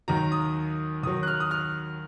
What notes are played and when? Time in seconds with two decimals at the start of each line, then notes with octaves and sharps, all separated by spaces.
0.08 D#2 D#3 F#3 A#5
0.32 D#6
1.03 D#2 D#3 F#3 D#6
1.23 F#6
1.27 F6
1.40 D#6
1.51 F6